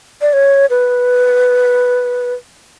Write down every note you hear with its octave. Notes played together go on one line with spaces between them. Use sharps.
D5
C#5
B4